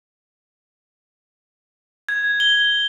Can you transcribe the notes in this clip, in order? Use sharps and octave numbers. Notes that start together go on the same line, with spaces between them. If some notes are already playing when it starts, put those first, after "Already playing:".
G#6
G7